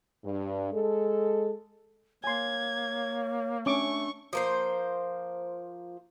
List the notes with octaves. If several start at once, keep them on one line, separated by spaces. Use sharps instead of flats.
G2
G#3 A4
A#3 C#5 G#5 C6 G#6
A3 C#4 D4 C#6 D6
F3 A#3 C5